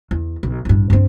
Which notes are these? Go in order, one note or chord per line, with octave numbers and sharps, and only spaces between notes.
E2
B1
A1 G2
G2 C4